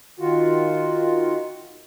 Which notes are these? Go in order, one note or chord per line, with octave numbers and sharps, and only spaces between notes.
D#3 F4 F#4